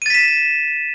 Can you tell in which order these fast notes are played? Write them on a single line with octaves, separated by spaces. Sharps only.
D#7 A6 B6 E7